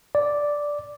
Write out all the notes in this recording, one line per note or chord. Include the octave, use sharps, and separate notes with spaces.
D5